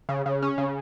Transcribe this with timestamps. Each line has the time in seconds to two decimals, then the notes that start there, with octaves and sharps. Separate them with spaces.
0.09 C#3
0.26 C#3
0.42 C#4
0.58 C#3